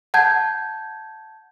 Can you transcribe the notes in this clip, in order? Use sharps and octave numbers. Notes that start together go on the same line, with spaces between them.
F#5 A5 G6 G#6